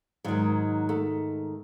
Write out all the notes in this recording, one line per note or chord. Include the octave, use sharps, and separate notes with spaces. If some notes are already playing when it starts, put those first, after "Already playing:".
G#2 D#3 F#3
A3